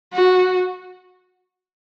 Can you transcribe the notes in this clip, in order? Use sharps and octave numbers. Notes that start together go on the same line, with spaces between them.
F#4